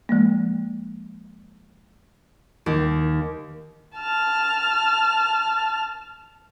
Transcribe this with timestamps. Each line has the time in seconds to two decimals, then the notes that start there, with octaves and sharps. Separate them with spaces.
0.09 F3 G#3 A#3
2.66 D#2
3.96 A5 F6